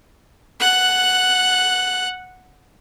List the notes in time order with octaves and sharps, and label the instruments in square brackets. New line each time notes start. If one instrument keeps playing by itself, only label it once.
[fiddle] F#5 F#6